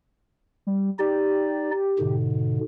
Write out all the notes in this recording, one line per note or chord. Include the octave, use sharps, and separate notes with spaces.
G3
D#4 G4 D5
G#2 B2 D3